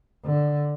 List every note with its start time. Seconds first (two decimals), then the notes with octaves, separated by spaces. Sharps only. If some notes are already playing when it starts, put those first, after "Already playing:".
0.25 D3